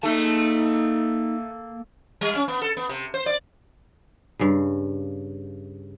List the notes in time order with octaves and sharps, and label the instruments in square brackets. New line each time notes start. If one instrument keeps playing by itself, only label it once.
[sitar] A3 [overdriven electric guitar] A#3 A5 [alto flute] D#4
[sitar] G3
C#4
B3
A4
B3
C3
C5
D5
[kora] G2 C#3